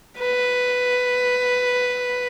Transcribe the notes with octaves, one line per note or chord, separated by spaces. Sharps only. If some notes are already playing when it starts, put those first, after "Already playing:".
B4